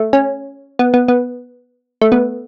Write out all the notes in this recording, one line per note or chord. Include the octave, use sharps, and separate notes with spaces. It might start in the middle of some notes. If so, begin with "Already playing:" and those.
Already playing: A3
C#4
B3
B3
B3
A3
B3